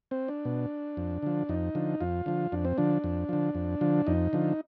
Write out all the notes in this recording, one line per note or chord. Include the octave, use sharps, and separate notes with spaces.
C4
D4
B2
F2
D3 F3
F2 D#4
D3 F3
F2 F4
D3 F3
F2 D4
C4
D3 F3 D4
F2
D3 F3
F2
D3 F3
F2 D#4
D3 F3